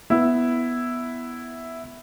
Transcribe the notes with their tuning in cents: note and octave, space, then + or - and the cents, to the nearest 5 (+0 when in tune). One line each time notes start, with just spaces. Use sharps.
B3 +0 E4 +0